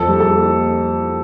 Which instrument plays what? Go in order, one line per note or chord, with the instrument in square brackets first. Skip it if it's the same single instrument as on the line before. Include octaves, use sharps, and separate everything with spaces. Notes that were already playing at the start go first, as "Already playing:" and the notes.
Already playing: [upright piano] F2 F3 A4
G3
A4
A#3